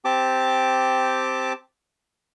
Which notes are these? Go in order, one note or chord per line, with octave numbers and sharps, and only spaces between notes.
C4 G4 A5 D6